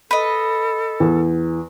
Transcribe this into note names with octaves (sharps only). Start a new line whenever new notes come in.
A4 B4 D#5
E2